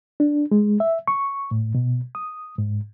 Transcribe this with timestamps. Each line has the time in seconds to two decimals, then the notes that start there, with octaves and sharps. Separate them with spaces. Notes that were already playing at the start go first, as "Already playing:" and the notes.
0.20 D4
0.51 G#3
0.80 E5
1.08 C#6
1.51 A2
1.75 B2
2.15 D#6
2.58 G#2